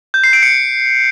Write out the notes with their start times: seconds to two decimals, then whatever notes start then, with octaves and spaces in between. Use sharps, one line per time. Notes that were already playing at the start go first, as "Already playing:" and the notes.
0.14 G6
0.24 C7
0.33 D7
0.43 C#7